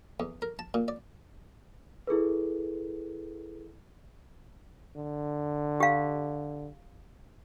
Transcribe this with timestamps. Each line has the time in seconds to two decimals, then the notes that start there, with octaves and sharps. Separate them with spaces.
0.20 E2
0.42 A#4
0.59 A5
0.74 A#2
0.88 D5
2.07 E4 G#4 A4 B4
4.96 D3
5.80 G4 F5